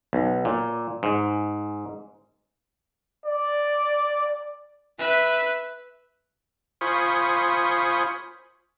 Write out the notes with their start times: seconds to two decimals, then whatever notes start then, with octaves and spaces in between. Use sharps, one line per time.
0.13 B1
0.45 A#2
1.03 G#2
3.26 D5
4.99 B4 E5
6.81 F4 C5 G#5 B5 C#6 D#6